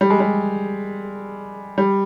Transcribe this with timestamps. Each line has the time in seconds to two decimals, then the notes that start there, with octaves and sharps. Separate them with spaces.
0.01 G3
0.10 G#3
0.20 G3
1.78 G3